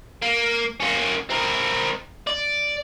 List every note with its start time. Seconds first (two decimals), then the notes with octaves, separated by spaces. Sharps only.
0.22 A#3
0.80 A#3 C#4
1.30 C4 A#4
2.27 D5